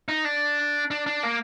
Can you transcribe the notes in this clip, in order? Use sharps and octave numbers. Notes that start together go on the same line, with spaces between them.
D#4
D4
D4
D4
A#3